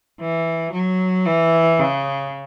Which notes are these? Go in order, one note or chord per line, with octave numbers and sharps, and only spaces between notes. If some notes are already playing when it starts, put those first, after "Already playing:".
E3
F#3
E3
C#3